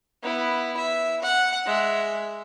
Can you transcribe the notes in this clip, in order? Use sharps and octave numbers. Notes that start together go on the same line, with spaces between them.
B3 E4
E5
F#5
G#3 E5